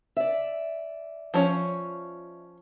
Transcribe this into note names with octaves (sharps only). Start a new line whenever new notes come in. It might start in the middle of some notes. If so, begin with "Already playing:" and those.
D5 E5
F3 C#4 C#5